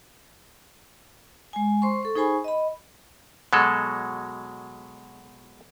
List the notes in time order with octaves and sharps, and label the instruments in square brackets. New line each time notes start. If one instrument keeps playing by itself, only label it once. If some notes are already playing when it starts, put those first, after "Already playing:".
[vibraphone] G#3 G#5
C5 C6 C#6
A4 C#6
D#4 G#4 C5 G#5 B5 C#6
D#5 B5
[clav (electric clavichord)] B2 F#3 G#3 A4